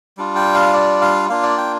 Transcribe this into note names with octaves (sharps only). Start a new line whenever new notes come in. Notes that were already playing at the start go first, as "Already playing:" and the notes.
G3 D4 F4
G5
F5
D5
F5
A#3 D4 F4 F5
D5
G5